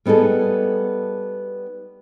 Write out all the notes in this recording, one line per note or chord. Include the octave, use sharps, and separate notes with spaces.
G3 B3 D#4 G#4 A4